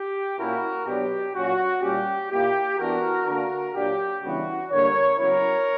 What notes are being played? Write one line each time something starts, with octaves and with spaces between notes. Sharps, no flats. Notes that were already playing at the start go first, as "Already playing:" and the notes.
Already playing: G4
A#2 A#3 C#4 E4 F#4 A#4
B2 F#3 B3 D4 G4
A#2 F#3 C#4 F#4
A#2 G3 C#4 G4
A#2 A#3 E4 G4
E3 B3 D4 F#4 A#4
D3 A#3 D4 F#4 A#4
A#2 F#3 A#3 D4 G4
C#3 E3 G3 B3 D4 F#4
D3 G3 A#3 A#4 C#5
C#3 F#3 B3 E4 A#4 C#5